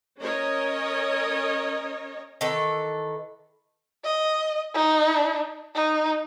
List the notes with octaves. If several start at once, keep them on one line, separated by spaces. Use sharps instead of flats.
C#4 A#4 C#5 D#5
D#3 E3 A4 B4
D#5
D#4
D#4